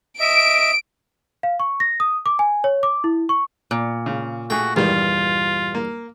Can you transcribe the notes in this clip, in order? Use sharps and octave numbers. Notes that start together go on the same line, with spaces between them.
D#5 E5 D7
F5
C#6
A#6
D#6
D6
G#5
C#5
D6
E4
C#6
A#2
C#3
A3 F#4 G#4 G5
E2 G2 D#3 G3 F4
A#3